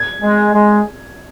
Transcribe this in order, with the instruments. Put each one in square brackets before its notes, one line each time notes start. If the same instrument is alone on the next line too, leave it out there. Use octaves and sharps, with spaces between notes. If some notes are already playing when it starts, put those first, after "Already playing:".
Already playing: [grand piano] G#6
[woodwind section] G#3
G#3